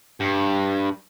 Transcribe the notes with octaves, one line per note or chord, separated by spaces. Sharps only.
G2